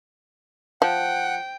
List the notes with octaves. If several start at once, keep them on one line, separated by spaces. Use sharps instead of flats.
F3 F#5 G5